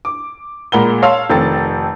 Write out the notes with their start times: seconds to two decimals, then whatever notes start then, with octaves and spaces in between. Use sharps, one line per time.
0.05 D6
0.72 A#2 G#3 A#4 F#5 B5 G7
1.02 C#5 F5 A5 C6 E6
1.30 F1 D#3 C4 A4 A5 A6